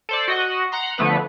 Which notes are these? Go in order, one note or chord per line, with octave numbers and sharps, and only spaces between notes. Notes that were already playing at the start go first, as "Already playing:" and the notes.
A4 C5 D5
F#4 D#5 F#5
F#5 A#5 C6
D3 F3 A3 B3 B4